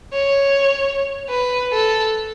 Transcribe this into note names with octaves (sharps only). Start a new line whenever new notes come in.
C#5
B4
A4